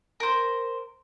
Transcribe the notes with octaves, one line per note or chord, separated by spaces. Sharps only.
A#4 C5